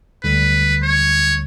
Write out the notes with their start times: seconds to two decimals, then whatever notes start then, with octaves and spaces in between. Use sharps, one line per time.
0.23 D2 D3 G3 B4
0.83 C#5